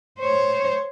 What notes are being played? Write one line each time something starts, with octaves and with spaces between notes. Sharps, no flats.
C5 C#5